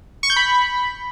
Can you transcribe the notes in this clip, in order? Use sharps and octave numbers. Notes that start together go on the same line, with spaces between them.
C#6
G6
B5